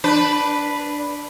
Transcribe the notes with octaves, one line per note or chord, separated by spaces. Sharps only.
D4 B4